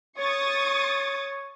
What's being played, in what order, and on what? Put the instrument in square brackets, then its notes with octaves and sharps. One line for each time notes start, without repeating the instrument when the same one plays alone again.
[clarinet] C#5 [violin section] C#6 D#6 A6